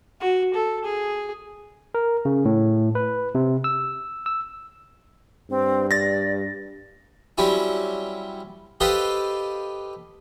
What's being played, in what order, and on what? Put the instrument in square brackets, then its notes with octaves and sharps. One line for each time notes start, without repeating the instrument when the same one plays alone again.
[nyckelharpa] F#4
A4
G#4
[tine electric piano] A#4
C#3
A2
B4
C3
E6
E6
[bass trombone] G2 [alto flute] C4
[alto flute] D5 [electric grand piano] A6 A#6
[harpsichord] F#3 G3 C4 C#4 E4
G4 A4 B4 C5 D#5 F5